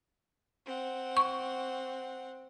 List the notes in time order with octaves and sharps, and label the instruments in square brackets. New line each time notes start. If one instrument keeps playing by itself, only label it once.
[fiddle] C4 F#5
[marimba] C#6